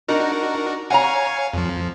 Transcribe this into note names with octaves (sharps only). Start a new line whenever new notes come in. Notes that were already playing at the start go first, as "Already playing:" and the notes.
D4 D#4 F#4 A#4
C#5 F5 F#5 G#5 A#5
F2 F3